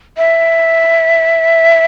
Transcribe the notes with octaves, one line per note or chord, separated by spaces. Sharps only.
E5